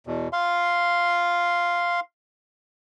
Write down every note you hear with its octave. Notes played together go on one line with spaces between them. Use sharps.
E2 B2
F5 C6